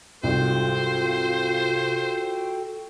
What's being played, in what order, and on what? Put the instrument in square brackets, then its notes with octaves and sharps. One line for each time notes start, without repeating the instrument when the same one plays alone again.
[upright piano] C2 G#2 [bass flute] F4 [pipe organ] F#4 A4 G5 [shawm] C5